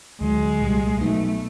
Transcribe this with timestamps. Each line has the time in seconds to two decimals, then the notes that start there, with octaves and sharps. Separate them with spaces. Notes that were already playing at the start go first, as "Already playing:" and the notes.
0.21 D2 D3 F#3 G#3
0.61 C2 A#2 G3
1.01 B2 F#3 A3 B3 D#4